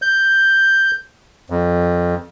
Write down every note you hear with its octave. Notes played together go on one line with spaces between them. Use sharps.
G6
F2